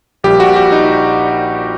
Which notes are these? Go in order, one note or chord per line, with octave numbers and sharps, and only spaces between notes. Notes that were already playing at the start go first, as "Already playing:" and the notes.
A#1 A#2 G3 G4
F#4
G4
D#4